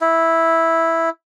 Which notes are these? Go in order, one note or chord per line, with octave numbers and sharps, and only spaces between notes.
E4